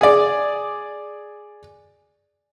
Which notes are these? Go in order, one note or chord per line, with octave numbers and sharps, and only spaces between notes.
G#4 D5